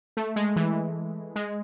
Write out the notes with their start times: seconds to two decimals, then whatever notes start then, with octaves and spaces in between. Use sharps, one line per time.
0.17 A3
0.36 G#3
0.56 E3
1.36 G#3